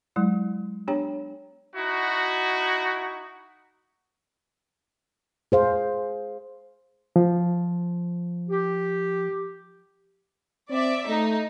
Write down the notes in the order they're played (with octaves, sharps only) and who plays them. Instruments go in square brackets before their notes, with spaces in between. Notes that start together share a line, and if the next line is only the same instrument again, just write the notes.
[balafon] F#3 G#3 E4
B3 D4 G4 C#5 G5 A#5
[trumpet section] D#4 E4 F#4
[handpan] G#4 C5 F5
[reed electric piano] F3
[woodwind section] G4
[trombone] C4 [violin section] D5 E5
[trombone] A3 [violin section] D#4